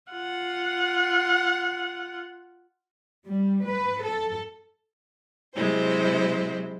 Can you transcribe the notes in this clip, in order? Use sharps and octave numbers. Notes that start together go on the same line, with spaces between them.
F4 F#5
G3
B4
A4
C3 F#3 G#3 E4 C5